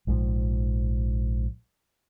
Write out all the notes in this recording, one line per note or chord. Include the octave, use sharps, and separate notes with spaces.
A#1 G#2 B2 F3